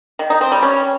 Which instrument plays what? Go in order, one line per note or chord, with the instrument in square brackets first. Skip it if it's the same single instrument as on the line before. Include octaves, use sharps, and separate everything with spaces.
[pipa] D#3
D#4
C4
G3
C#4